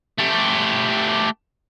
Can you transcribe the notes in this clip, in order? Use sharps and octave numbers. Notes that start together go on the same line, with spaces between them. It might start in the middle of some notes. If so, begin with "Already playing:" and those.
A3 G4